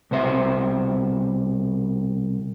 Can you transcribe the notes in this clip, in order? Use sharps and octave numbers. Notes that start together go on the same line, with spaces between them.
C2 B2 C5 E5